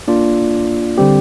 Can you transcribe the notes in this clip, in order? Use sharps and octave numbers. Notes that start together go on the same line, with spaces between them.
A#3 D4 F4 D5
D3 G3 C4 G4